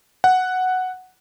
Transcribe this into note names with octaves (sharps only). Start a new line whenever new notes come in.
F#5